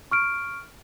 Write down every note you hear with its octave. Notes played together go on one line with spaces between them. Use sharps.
C#6 F6 D7